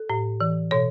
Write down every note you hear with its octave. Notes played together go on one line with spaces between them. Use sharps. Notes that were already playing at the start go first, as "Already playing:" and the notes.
Already playing: A4
A2
E3
B2 C#5